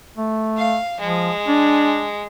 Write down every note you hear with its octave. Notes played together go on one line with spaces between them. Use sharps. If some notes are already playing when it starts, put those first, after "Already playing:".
A3
F5
F3 G#3
D4